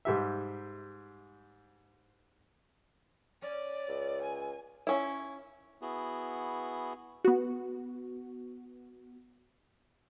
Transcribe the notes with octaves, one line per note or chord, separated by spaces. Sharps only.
G#2 G3 E5
C#4 D5
C#2
G#5
C#4 E4
B3 E4 F#4 G#4
B3 F#4